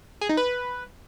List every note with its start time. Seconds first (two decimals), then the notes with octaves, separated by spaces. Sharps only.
0.21 G#4
0.29 D#4
0.37 B4